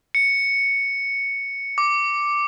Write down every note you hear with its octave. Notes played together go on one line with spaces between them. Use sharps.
C#7
D6